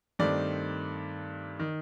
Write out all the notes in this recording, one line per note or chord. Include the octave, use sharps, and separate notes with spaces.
G2 D#3 A3 C4 D5
D#3